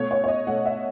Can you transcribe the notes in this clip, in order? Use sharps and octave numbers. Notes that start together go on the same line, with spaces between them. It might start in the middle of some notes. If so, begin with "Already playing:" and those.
Already playing: B2 A3 C#5
C#5
C#5
D#5
B2 A3 F#5
E5